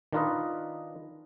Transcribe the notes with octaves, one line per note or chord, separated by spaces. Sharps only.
D#3 D4 F4 A#4 B4 D#5